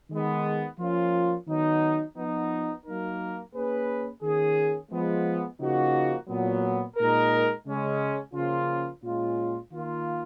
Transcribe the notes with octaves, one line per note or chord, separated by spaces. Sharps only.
D#3 G#3 B3
F3 A#3 C#4 F4
D#3 F#3 B3 D#4
F3 B3 D#4
F#3 A#3 D#4 A#4
A#3 C#4 G#4 B4
D#3 A#3 C#4 G#4
F3 G#3 B3
C#3 F3 A#3 D#4 F#4
A#2 F#3 B3
A#2 G#3 D#4 A#4
C#3 G#3 C#4
C#3 F3 A#3 C#4 F4
A#2 G#3 C#4 F4
D#3 A#3 F4